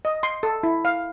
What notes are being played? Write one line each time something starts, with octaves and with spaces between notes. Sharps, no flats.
D#5
C6
A4
E4
F5